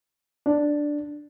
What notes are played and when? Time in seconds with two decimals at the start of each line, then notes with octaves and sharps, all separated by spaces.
0.46 D4